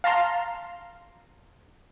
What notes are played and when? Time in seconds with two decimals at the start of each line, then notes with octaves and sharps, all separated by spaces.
0.04 F5 A5 A#5 C6